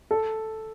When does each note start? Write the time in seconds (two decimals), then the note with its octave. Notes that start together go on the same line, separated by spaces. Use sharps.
0.11 A4